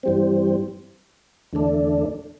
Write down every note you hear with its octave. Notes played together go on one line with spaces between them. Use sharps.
G2 E3 G3 C4
E2 D3 A3 D4